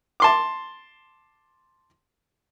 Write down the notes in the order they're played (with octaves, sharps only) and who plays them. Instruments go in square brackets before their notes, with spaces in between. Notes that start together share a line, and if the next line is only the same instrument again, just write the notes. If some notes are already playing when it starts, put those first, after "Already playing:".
[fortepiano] A5 C6 D6